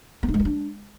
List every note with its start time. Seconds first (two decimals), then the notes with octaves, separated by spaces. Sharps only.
0.23 B3
0.28 D#4
0.34 G#3
0.40 F4
0.45 D4